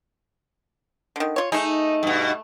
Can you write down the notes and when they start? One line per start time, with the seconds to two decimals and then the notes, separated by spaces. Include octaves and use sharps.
1.16 D3 D#3
1.36 F4 C#5
1.52 A3 D#4 G#4
2.03 G2 B2